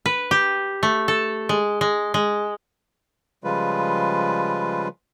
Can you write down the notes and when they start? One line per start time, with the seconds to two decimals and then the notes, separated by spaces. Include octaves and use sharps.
0.06 B4
0.31 G4
0.83 A3
1.08 A4
1.49 G#3
1.81 G#3
2.14 G#3
3.44 C#3 F3 G3 G#3 F4 B4